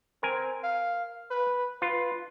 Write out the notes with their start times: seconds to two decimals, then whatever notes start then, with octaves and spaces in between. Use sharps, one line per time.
0.23 C4 A#4 G#5
0.64 F5
1.31 B4
1.82 F4 B4